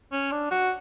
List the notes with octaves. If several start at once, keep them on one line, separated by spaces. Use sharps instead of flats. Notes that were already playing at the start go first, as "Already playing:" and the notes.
C#4
D4
F#4